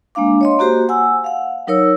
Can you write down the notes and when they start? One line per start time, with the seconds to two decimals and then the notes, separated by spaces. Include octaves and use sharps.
0.15 G#3 A#3 D4 F5 D6
0.41 C#5 D#5 C6
0.59 A#3 F#4 G4 C5
0.89 F#5 G#5 E6
1.24 F5 F#5
1.67 F#3 D#4 A#4 C#5 E6